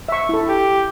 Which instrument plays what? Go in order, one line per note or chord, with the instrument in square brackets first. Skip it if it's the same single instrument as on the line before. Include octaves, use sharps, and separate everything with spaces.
[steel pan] E5 C#6
E4 A4
[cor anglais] G4